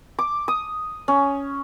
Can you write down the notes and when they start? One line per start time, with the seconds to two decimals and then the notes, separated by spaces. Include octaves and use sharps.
0.19 D6
0.48 D#6
1.08 C#4